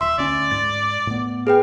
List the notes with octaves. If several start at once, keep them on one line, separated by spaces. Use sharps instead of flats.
D#1 E5 C6
D2 C#4 D5
G#2 A6
A2 B3
G#4 B4 F5 G5